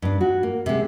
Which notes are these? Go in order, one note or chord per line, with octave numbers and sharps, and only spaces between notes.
G2 D4
F#4
A#3
C3 G#3